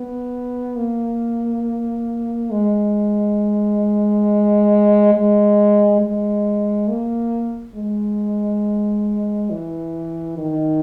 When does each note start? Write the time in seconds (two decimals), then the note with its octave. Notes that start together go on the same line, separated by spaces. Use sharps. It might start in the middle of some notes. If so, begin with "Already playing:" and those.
Already playing: B3
0.76 A#3
2.51 G#3
5.14 G#3
6.01 G#3
6.88 A#3
7.75 G#3
9.50 E3
10.38 D#3